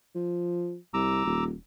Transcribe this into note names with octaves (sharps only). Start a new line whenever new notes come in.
F3
C2 A#5 D6 E6
D#1